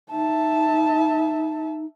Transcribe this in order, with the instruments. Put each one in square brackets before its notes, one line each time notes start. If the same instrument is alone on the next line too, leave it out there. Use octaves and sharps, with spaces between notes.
[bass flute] D#4 [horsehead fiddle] E5 A5